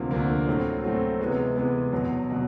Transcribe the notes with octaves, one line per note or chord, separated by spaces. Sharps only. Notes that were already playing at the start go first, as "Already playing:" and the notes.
Already playing: D2 C3 F3 A#3
D2 C3 F3 A#3
A2 F#3 A3 C4
A2 F#3 A3 C4
C3 E3 G#3 B3
C3 E3 G#3 B3
E2 B2 F#3
B2 F#3